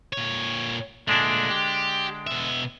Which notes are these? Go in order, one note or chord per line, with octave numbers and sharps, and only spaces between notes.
A#2 C#5
A#2 D3 G#3 A3 D4
G4
B2 E5